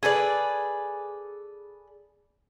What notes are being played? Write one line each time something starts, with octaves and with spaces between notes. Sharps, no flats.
G#4 A4 B4 D5